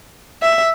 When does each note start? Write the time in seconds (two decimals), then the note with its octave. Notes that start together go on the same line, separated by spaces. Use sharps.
0.42 E5